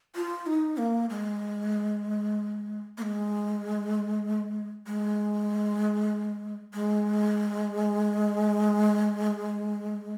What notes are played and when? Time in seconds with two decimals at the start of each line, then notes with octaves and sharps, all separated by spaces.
0.15 F4
0.46 D#4
0.77 A#3
1.10 G#3
2.98 A#3
3.02 G#3
4.87 G#3
6.74 G#3